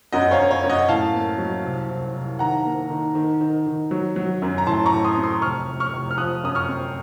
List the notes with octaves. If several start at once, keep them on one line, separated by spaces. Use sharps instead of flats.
F#2 D#5 F#5
C#5 F5
F#2
C#5
F#2
D#5 F#5
A2 F5 A5
A#3
F#3
C2
C2
C2
D#3 F#5 A#5
A#3
D#3
D#3
D#3
D#3
F#3
F#3
F#2
A#5
A2 A5 C6
A#5 C#6
A2
C6 D#6
C4
C6 D#6
F1 C#6 F6
F1
C#6 F6
F1
F6
F3 D#6 F#6
F#2 D#6
C#6 F6
C4